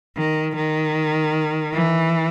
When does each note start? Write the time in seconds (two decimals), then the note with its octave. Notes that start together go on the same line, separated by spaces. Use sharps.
0.17 D#3
0.56 D#3
1.74 E3